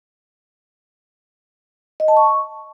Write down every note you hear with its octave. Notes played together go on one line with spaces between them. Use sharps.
D#5
A5
C#6